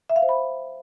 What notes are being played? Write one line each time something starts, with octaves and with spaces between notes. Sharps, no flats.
E5
F5
C5
B5